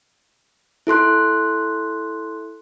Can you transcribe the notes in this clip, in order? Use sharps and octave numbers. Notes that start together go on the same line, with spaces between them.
E4 A4 C6 F#6